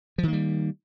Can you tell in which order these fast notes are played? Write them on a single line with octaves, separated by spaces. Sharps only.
F3 D#3 A#3 G3